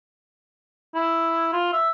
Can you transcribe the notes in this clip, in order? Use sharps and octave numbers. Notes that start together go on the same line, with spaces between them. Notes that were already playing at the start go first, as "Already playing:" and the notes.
E4
F4
E5